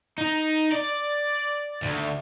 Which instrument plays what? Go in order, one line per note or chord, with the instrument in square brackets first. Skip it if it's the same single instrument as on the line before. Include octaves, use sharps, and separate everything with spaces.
[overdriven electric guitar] D#4
D5
D2